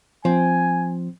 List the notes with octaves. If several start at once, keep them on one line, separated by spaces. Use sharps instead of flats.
F3 C4 G#5